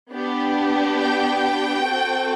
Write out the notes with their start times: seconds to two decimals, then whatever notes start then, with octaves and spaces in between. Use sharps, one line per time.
0.11 B3 D4 G4
0.98 G5
1.85 C4 F#4 A4